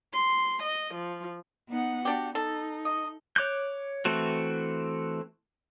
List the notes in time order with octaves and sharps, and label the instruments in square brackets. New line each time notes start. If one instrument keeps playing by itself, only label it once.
[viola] C6
D#5
F3
[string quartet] B3 D#4 F#5
[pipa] D4 G4 [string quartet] F#4
[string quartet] D#4 [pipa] A4
[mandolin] D#5
[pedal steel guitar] C#5 D6 F#6 G6
E3 A3 C4 E4 F#4